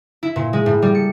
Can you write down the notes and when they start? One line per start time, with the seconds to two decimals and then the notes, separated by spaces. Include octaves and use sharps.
0.23 E4
0.36 A#2
0.53 G#3
0.66 A2
0.82 G3
0.95 C#7